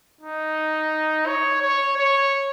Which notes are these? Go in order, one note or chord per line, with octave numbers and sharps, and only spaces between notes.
D#4
C#5
C#5
C#5